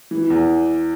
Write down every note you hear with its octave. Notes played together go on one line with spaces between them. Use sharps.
E3
E2